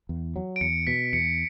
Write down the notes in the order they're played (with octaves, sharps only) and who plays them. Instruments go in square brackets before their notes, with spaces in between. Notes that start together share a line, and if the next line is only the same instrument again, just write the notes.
[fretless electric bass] E2
F#3
[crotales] D7
[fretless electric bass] E2 [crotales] C#7
[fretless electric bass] B2 [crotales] B6
[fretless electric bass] E2 [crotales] C#7